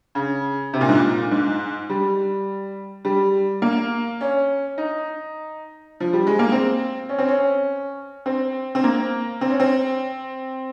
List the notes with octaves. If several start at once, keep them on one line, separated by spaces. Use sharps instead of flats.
C#3
C3
A#2
G#2
A#2
G#2
G3
G3
A#3
C#4
D#4
F3
G3
G#3
A#3
C4
C#4
C4
C#4
C4
C4
A#3
C4
C#4
C4